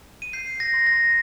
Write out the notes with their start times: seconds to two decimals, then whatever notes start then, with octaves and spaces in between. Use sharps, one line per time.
0.22 D#7
0.33 G6 C7
0.60 A#6
0.74 C6
0.87 A#6